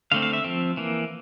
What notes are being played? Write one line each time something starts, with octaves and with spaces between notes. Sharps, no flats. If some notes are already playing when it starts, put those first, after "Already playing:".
D3 A3 C4 F5
F5
E5
F3 C4
E3 A#3